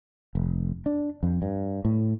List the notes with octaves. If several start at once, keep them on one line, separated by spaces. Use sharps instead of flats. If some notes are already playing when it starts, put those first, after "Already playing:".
F1
D4
F2
G2
A2